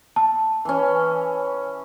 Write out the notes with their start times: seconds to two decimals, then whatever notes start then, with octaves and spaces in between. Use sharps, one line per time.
0.16 A5
0.65 E3 C#4